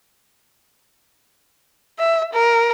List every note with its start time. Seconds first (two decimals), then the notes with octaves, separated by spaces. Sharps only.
1.98 E5
2.33 A#4